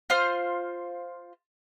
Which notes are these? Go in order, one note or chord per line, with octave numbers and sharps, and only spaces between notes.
F4 C5 F6